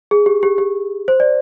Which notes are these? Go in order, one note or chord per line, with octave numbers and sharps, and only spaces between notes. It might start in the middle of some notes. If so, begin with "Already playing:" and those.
G#4
G4
G4
G4
C5
D5